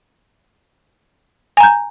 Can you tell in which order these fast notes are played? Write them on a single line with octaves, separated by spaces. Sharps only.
G#5 A#5 G6